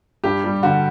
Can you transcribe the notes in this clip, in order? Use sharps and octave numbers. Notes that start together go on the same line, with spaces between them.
G2 G4
G3
D3 F#4